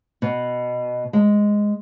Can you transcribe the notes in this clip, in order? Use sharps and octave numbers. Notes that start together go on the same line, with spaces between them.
B2
G#3